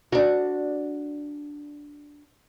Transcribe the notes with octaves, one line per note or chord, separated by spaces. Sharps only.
D4 F#4